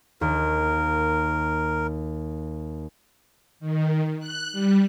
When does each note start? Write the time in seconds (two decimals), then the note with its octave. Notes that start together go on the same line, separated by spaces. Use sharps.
0.21 D#2 A#4
3.60 D#3
4.19 F#6
4.52 G3